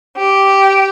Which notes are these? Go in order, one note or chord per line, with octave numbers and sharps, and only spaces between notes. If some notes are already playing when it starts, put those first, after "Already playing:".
G4